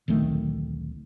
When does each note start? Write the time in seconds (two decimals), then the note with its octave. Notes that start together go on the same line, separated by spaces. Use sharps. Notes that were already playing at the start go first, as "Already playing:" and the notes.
0.08 D1 A#1 D#3 A3